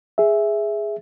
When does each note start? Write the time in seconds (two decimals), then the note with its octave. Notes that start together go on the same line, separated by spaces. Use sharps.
0.18 G#4 E5